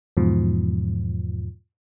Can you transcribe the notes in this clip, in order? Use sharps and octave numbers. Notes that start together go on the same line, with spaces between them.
E2 G#2 B2 F3